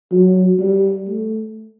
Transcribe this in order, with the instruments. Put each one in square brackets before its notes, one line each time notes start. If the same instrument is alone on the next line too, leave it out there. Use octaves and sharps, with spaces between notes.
[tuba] F#3
G3
A3